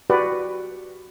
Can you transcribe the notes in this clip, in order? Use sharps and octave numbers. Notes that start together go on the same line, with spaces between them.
F#4 G4 B4 D5